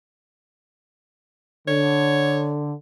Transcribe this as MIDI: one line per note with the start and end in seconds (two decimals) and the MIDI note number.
1.67 2.73 50
1.67 2.51 73